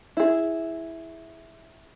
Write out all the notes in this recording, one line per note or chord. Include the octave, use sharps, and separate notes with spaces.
E4 G#4